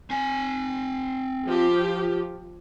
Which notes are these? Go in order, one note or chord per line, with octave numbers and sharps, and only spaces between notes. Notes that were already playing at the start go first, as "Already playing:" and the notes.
C4 G#5
F3 G4